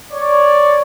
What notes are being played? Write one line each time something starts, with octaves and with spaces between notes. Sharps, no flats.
C#5 D5